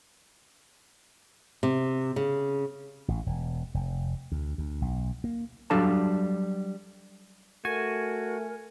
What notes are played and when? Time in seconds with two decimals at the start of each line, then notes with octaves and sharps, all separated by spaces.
1.63 C3
2.16 C#3
3.08 A1
3.26 E1
3.74 F1
4.32 D2
4.58 D2
4.82 B1
5.24 A#3
5.70 F#3 G3 D4 A4 F5 A5
7.65 A3 F#4 A#4 G#5